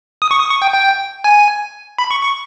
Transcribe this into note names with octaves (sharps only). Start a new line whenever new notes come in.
D#6
C#6
D#6
C#6
G5
G5
G#5
B5
C#6
C#6